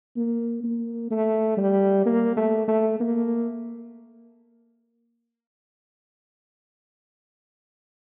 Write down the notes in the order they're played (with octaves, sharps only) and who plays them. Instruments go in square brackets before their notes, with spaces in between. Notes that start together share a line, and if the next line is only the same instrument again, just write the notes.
[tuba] A#3
A#3
A3
G3
A#3
A3
A3
A#3